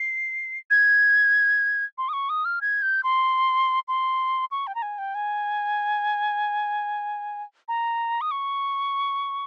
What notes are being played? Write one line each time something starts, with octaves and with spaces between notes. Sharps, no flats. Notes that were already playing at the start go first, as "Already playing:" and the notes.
Already playing: C7
G#6
C6
D#6
C#6
D#6
F6
G#6
G6
C6
C6
C#6
G5
A#5
G#5
G5
G#5
A#5
D#6
C#6